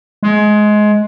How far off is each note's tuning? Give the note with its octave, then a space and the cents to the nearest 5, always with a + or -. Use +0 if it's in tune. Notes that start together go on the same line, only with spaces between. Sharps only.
G#3 +20